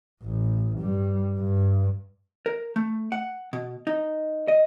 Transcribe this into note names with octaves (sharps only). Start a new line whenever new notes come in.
A1
G2 G3
G2
A#4
A3
F#5
B2
D#4
D#5